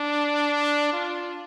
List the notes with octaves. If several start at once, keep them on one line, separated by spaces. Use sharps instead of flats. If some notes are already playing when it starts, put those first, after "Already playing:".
Already playing: D4
F4